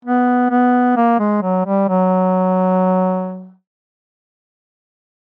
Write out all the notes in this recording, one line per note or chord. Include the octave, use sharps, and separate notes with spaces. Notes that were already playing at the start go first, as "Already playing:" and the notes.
B3
B3
A#3
G#3
F#3
G3
F#3